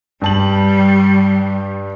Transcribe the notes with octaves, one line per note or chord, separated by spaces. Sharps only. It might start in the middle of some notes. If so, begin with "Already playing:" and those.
G2 G3 A5 F#7